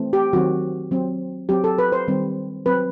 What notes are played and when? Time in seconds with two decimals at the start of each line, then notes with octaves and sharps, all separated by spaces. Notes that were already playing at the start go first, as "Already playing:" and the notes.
Already playing: E3 A3 C4
0.13 G4
0.33 D#3 F#3 C4 F#4
0.91 F#3 C4
1.49 F#3 C4 G4
1.64 A4
1.79 B4
1.92 C5
2.08 D#3 G3 C4
2.66 F#3 C4 B4